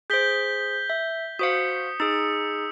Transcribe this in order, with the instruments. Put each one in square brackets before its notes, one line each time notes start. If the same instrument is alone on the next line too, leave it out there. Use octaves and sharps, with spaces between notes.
[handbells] G#4 C5 [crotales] G6 B6 G7
[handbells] E5
[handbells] F#4 C5 F5 [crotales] D#6 C#7
[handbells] D#4 G#4 [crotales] E6